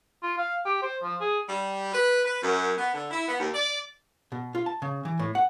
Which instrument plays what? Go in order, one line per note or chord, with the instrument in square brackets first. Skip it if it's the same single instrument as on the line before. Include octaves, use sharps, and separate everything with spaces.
[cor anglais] F4
F5
G4
C5
F3
G#4
[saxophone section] G3
B4
B4
F#2
B3
D3
E4
B3
D#2
D5
[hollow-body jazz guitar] B2
F4
A5
C#3
E3
A2
F#5